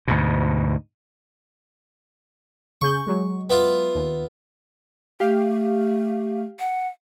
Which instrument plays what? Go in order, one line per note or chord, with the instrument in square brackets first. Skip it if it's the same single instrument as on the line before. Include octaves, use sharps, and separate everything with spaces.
[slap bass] D2 G#2 B2
[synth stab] C#3 G#4 G6 [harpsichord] C#6
[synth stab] F#3 G#3
[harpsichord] B3 E4 F4
[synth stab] D#2
[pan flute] A3 [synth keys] G4 F5
[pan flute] F#5